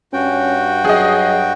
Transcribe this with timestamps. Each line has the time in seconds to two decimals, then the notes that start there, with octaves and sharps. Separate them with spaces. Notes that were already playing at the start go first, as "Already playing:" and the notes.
0.13 G2 C#4 F#4 G5
0.85 F#3 G#4 D#5